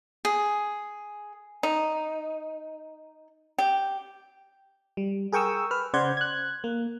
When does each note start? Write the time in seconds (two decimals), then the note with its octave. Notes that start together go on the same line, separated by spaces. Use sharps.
0.25 G#4
1.63 D#4
3.58 G4
4.97 G3
5.33 G#4 A#4 G5 C#6 D#6 E6
5.71 B4 F6
5.94 C#3 C5 D5 F#5 G6 G#6
6.17 F#6 G#6
6.64 A#3